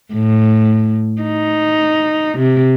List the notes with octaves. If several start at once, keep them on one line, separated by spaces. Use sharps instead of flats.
A2
D#4
C3